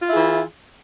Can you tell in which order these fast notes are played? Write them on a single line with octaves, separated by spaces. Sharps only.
F4 E4 G#4 E3